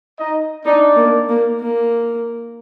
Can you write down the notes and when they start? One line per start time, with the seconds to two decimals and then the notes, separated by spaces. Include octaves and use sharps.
0.18 D#4 D#5
0.65 D4 D#4 D5
0.96 A#3
1.29 A#3
1.60 A#3